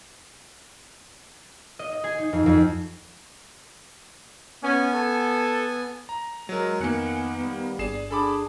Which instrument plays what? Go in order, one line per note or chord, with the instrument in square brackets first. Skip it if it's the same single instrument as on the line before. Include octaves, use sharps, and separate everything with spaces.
[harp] D#5
D#5
G#4
D#4
F2
F2
[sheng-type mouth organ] B3 G#5 [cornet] C#4
[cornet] A4
[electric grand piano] A#5
[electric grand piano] F#3 A#4 [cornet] G#3
[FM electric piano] F2 F#6 C#7 [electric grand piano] D#3 A#3 [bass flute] B3 [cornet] G#5
[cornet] G3
[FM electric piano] G1 D5 [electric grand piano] G#4 C7 E7
[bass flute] D4 [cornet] G#4 [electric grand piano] A4 B5 D6